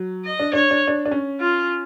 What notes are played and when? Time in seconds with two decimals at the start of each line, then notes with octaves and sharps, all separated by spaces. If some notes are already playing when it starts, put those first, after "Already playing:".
Already playing: F#3
0.25 D#5
0.39 D4
0.53 D4 C#5
0.71 D4
0.88 D4
1.06 D4
1.11 C#4
1.40 F4